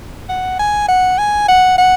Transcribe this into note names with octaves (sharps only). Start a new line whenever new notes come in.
F#5
G#5
F#5
G#5
F#5
F#5